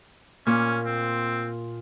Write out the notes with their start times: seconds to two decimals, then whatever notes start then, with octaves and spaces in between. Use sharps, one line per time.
0.47 A#2 C#4
0.86 C4